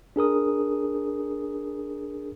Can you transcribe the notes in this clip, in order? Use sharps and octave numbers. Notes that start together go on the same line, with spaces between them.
D4 G#4 A#4 D#6